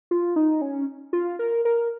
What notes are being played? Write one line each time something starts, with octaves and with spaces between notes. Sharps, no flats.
F4
D#4
C#4
F4
A#4
A#4